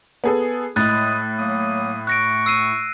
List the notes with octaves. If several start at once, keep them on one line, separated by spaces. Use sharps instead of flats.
B3 G#4 A4
A2 G#3 E4 D#6 F#6 A6
F#3 A#3 D#6
C#6 F#6 A#6 D7
E6 C7 D#7